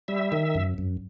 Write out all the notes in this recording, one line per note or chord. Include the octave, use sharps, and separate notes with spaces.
G3 E5
D#3
F#2
F#2